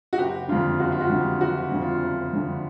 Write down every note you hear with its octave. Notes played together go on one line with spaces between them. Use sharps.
F#4
F#1 G4
F2 D3 F4
F#1 F#4
F4
F#4
F2 D3
G4
F#1 F#4
F2 D3
F4
F#1
F2 D3